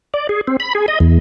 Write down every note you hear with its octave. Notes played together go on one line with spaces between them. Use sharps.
D5
G#4
C4
B5
G#4
D#5
E2